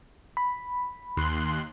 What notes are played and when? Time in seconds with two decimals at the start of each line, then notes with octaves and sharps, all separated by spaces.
0.37 B5
1.17 D#2 C6 F#6